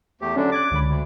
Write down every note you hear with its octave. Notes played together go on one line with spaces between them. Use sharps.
E2 A3 G4
D3 F#3 C#4 D4 A4 D5
D6 F#6 G#6 A6
C#2 D3 B5
D2